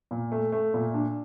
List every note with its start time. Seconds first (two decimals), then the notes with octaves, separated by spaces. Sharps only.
0.11 A#2
0.32 A3
0.52 A3
0.74 A#2
0.94 D4